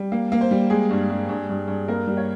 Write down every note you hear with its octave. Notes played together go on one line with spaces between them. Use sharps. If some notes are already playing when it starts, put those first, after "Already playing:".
Already playing: G3
A#3
A#3
C5
G3
G#3 G#4
G2
G2
G2
G2
G2
A#3 A#4
G3
C#5